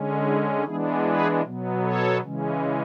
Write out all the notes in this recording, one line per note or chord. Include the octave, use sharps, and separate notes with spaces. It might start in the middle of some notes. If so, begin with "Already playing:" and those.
Already playing: D3 G#3 C#4
E4 G#4
E3 G#3 B3 D4 E4 G#4
G#4 B4
B2 F#3 B3
A4 C#5
C#3 E3 G#3 C#4